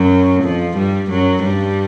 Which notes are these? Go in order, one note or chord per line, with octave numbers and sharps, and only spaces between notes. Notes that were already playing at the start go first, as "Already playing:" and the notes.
Already playing: F#2 F#3
F2 F3
G2 G3
F#2 F#3
G2 G3